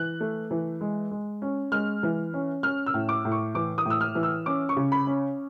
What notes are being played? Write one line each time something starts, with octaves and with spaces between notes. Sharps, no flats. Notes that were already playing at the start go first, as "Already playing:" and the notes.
Already playing: E3 F#6
A3
E3
G#3
G#3
C#4
G#3 F6
E3
C#4
C#4 F6
E6
A2
D6
A2
C#6
E3 D6
D#6
A2 E6
F6
E3
E6
C#4 D6
C#6
C#3
B5
C#4